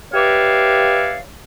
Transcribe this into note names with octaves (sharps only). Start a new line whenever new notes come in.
G4 B4 C#5 D5 E5 F5